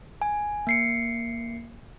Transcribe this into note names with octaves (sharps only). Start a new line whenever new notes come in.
G#5
A#3 C7 C#7